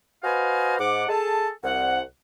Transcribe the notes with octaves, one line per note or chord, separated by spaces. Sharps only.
F#4 B4 C5 D#5 F5 G#5
G#2 F#5 D6
G#4 A4 A5
C2 F#5